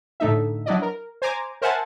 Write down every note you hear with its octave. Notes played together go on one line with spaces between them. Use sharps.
A2 D3 A3 D#4 E5
F#3 D4 E4 D5 D#5
A#4
C5 G#5 A#5 D6 G#6
A#4 C5 E5 F#5 G#5 A5